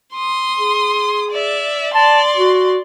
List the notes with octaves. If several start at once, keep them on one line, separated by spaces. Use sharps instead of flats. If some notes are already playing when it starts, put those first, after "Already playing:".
C6 D#6
G#4
D5 E5
D5 A5 C6
F#4